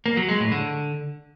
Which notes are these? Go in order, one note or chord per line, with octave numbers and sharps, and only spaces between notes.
A#3
F#3
G#3
A2
D3